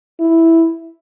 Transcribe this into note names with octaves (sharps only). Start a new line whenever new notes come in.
E4